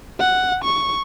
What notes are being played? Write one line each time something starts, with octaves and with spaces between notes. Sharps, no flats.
F#5
C#6